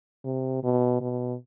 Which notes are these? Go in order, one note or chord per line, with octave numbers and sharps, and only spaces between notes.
C3
B2
B2